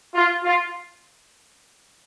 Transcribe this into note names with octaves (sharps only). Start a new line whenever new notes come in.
F4
F4